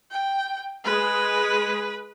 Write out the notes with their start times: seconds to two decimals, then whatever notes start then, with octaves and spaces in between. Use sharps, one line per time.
0.11 G5
0.85 G#3 B4